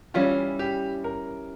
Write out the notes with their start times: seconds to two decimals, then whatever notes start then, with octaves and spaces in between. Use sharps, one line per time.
0.14 E3 G3 C#4 F4
0.59 G4
1.04 A#4